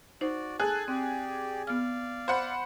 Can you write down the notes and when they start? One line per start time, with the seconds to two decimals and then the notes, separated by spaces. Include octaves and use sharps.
0.21 D#4 F#4 C5 D5
0.60 G#4 A4 G#5 A5 F#6
0.88 C4 G4 D5
1.67 B3 D5 F5 F6
2.28 C5 F#5 B5